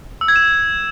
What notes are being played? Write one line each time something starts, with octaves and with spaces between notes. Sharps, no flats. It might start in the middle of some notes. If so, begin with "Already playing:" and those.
E6
G#6
E7